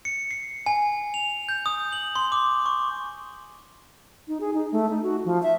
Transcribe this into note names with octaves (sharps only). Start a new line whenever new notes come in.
C#7
C7
G#5
F7
G6
D#6
F#7
C6
D6
C#6
D#4
G#4
D#4
A3
D#4
F#4
F3
E5